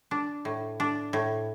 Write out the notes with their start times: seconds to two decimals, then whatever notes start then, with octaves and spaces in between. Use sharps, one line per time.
0.11 D4
0.45 A2
0.80 D4
1.13 A2